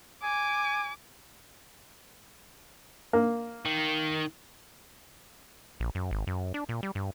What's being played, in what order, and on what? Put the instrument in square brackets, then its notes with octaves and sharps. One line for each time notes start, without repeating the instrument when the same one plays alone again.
[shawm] G#5 [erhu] D6
[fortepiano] A#3
[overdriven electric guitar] D#3
[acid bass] A#1
F#2
G#1
F#2
D4
A#2
G3
G2